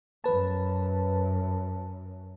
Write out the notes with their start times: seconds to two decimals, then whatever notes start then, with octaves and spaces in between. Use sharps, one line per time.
0.24 F#2 B4 A5